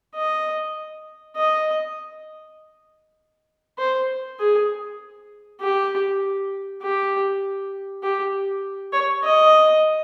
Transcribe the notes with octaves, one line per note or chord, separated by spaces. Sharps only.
D#5
D#5
C5
G#4
G4
G4
G4
C#5
D#5